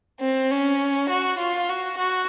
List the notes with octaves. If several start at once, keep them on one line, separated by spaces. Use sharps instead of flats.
C4
C#4
F#4
F4
F#4
F#4